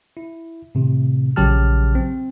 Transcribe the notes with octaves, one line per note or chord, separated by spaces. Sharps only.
E4
A2 C3 D#3
A#1 C#3 F#3 G4 A5 F6
C4